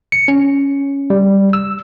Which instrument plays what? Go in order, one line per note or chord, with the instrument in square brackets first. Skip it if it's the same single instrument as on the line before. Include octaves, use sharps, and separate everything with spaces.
[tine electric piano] C#7
C#4
G3
E6